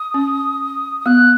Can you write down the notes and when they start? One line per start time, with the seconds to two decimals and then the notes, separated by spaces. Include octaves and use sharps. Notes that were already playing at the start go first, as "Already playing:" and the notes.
Already playing: D#6
0.14 C#4
1.01 D#6
1.06 B3 F#6